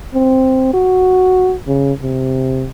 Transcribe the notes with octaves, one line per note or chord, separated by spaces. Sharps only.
C4
F#4
C#3
C3